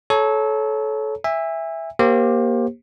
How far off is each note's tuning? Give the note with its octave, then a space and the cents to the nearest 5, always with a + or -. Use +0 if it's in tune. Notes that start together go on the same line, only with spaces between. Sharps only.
A4 -25 C#5 +0 A#5 +0
E5 +0 G#5 -35
A#3 +20 G4 +0 C5 +30